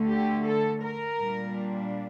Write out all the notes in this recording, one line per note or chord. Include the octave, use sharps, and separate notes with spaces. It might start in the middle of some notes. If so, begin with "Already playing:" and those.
Already playing: D2 D3 A3
G4
A4
A#4
A#2 G3 D4